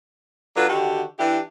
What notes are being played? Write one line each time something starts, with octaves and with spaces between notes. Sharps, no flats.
F#3 D4 F4 A4 B4
D3 D#3 F#4 G4
E3 D4 E4 G4